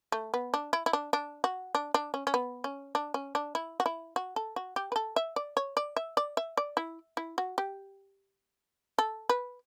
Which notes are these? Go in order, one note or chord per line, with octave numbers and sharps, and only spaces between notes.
A3
B3
D4
E4
E4
D4
D4
F#4
D4
D4
C#4
C#4
B3
C#4
D4
C#4
D4
E4
F#4
E4
F#4
A4
F#4
G4
B4
A4
E5
D5
C#5
D5
E5
D5
E5
D5
E4
E4
F#4
G4
A4
B4